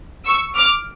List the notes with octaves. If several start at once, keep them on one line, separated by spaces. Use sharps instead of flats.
C#6 E6
D6 F6